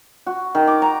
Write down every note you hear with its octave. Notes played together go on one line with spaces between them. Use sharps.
F#4
D#3
D6
A#5